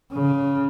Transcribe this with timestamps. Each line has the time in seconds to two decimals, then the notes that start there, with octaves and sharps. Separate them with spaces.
0.12 C#3